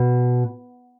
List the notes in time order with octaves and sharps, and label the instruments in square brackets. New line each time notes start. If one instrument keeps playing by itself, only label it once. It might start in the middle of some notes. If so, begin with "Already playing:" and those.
Already playing: [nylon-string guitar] B2